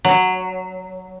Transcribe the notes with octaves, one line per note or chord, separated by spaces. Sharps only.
F#3